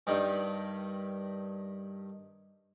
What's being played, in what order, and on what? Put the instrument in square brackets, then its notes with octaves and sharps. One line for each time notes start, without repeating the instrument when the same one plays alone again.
[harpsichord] G2 D#3 G3